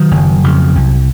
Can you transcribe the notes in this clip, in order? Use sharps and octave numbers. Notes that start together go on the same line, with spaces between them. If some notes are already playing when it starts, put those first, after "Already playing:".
Already playing: D#3 F#3
F#1
F2 C#3
C2